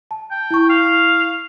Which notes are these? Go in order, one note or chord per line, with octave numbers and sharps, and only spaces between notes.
A5
G5
E4 C#6
F5